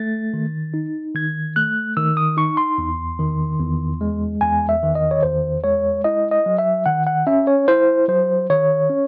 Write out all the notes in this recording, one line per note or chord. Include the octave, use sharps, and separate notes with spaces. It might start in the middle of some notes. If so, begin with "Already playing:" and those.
Already playing: A3 A6
D#3
D#4
D#3 G#6
A3 F#6
D#3 E6
D#6
D#4 C#6
C6
E2
D#3
E2
G#3
E2 G#5
E5
D#3
D#5
C#5
E2 C5
G#3 C#5
E4 D#5
D#5
F#3
E5
D#3 F#5
F#5
C#4 E5
C#5
E4 C5
F#3 C5
D#3 C#5
C#4